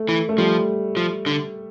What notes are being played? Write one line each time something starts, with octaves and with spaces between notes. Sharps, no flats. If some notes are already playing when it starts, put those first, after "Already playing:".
Already playing: A3
E3
A3
F3 G3
F3
D3